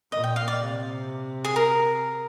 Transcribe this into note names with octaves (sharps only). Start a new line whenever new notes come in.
A#2 D#5
G5
F5
D5
C3
G#4
A#4